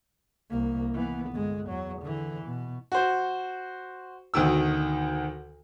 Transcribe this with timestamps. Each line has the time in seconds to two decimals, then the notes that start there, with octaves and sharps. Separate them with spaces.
0.49 C2 A#3
0.94 E3 B3
1.31 G1 G#3
1.68 E2 F#3
2.01 D3 E3
2.45 B2
2.92 F#4 C5
4.34 D2 B2 D#3 E6